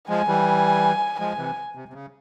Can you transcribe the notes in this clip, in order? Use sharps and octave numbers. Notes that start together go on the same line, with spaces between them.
F3 G#3 G#5
E3 G3
F3 G#3 G#5
C3 E3
C3
C3
C#3